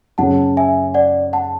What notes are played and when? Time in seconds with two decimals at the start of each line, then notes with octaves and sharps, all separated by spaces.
0.18 F#2 C#3 F#3 C#4 F#5 A5
0.57 E5 G#5
0.94 D5 F#5
1.33 F#5 A5